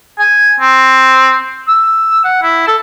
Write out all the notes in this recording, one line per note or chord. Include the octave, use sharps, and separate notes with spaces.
G#5
C4
E6
F#5
E4
A4